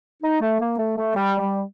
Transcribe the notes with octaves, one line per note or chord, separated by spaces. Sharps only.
D#4
A3
A#3
A3
A3
G3
G3